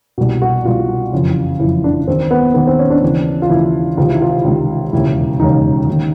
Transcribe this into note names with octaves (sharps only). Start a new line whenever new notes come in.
C2 B2
F#4
C2 B2 F4
F#1 F2 C#3 E3
F#1 F2 C#3 E3 E4
D4
D#2 D#3 C4
B3
D#2 D#3 B3
C4
C#4
D4
D#2 C#3 E3
F4
D#2 C#3 E3 E4
C#2 C3 D#3 F4
E4
F4
C#2 C3 D#3
E1 D#2 C#3 E4
E1 D#2 C#3 D#4
D#2 D#3